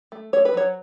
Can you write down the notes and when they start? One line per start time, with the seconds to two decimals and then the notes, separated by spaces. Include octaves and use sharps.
0.12 A3
0.33 A3 C#5
0.45 B4
0.54 F#3 C#5